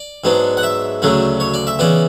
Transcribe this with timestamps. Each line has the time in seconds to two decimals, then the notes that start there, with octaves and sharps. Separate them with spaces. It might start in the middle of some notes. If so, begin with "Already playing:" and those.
Already playing: D5
0.24 G#2 F#3 B3 D4
0.57 F#5
0.63 E5
1.02 D2 C#3 F#3 A3 D4
1.40 C#5
1.54 D5
1.67 E5
1.79 C#3 E3 B3 D5